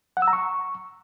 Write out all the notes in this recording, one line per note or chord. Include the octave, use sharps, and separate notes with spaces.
F#5
E6
A#5
C#6